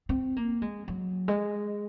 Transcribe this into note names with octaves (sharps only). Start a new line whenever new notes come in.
C4
A#3
G#3
F#3
G#3